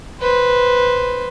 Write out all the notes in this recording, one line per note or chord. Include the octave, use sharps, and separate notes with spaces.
B4 C5